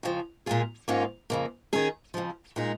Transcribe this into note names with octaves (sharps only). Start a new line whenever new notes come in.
F2 C#3 F3
A#2 G#3 F4 G#4
G#2 D#3 A#3 C#4 F4
F2 C#3 A#3
D#3 C#4 G#4
F2 C#3 F3
A#2 G#3 D#4 G#4